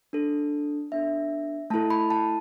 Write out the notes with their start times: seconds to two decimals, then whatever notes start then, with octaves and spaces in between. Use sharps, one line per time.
0.13 D4 A4
0.92 B3 D4 A4 E5
1.70 A3 E4 A4 A5
1.90 B5
2.10 A5